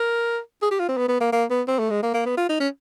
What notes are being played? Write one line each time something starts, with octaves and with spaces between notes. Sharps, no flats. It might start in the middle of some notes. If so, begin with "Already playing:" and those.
Already playing: A#4
G#4
G4
F4
C4
B3
B3
A#3
A#3
B3
C4
A3
G#3
A#3
A#3
B3
F4
D#4
C#4